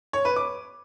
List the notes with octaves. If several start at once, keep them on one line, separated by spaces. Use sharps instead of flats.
C#5
B4
D6